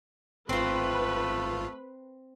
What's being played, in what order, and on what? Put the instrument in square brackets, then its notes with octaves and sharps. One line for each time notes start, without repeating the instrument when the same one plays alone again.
[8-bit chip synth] G#1 F4 [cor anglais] A3 [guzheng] C4 C6 [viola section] B4